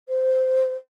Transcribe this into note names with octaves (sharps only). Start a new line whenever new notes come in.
C5